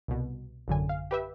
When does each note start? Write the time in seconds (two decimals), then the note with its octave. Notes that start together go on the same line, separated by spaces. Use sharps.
0.08 C2 B2
0.68 A1 F#2 D3 G#5
0.89 F5
1.11 G4 B4 E5